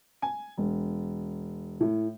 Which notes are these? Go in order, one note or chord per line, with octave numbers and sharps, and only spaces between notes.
G#5
E1
A2